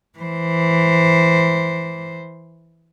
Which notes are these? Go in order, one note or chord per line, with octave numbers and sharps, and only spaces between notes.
E3 C5